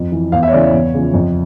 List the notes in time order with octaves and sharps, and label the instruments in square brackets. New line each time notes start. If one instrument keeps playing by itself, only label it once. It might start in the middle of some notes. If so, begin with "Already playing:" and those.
Already playing: [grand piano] F2
E3
E2 F5
E5
C#5
C#3 E3 D5
C#5
E2
C#3 F3
F2